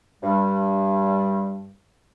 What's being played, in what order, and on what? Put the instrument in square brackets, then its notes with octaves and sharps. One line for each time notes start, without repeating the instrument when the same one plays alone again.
[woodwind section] G2 G3